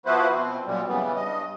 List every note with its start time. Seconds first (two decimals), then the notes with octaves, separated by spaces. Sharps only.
0.06 F3 B3 E4 F#4 B4 C5
0.32 B2 C4
0.65 F#2 A#2 G3
0.87 C#3 E3 G3 B3
1.16 G2 D#5